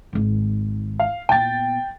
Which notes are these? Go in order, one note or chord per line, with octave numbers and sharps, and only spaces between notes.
G#1 D#3
F5
A#2 B3 G5 A6